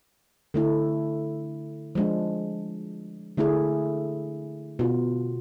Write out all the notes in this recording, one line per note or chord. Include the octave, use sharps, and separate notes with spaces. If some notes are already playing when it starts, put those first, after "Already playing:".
D3 A3 E4 A4
F3 G#3 D4
D3 A3 E4 G#4
B2 B3 F4